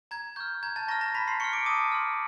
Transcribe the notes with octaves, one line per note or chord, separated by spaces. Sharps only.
A#5 G#6
C#6 F6 G6
A#5 G#6
A5 A6
A#5 C#6 F6 A#6
A#5 A#6
A5 B5 B6
C6 C7
C6 C#6 F6 C#7
D6 D7
A5 D#6 D#7
C6 F6